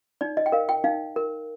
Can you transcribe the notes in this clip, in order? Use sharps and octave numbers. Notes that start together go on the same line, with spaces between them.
D#4 D5
D#5
G5
A#4 F5
G5
D#4 F5
A#4